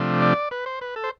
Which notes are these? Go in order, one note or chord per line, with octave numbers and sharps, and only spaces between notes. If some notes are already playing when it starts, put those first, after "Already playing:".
Already playing: C3 F3 A3 D4
D5
B4
C5
B4
A4
C5